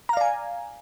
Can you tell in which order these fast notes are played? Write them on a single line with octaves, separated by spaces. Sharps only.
A#5 F5 D5 G#5